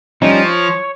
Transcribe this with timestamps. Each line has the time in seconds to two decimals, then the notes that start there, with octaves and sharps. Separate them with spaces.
0.22 F3 G3 C#4 D#4
0.44 C#5